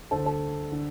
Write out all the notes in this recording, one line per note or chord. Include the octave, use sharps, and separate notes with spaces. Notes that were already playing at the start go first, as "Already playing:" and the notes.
D2 D3 A4 C5
A4 C5
D3